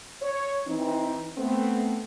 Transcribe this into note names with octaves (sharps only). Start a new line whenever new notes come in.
C#5
E3 C4 D#4
A3 B3 C4